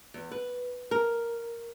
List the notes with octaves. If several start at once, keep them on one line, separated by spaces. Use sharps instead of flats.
E2
B4
A#4